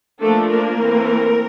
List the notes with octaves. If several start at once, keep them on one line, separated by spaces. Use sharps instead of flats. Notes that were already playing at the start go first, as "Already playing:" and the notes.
F3 A3 A#3 D4 A4
A#3 A#4
E3 A3 C4